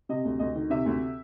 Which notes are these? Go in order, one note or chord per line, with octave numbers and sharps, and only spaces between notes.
C3 D#5
D2
D2 D#5
D#3
C3 E5
D2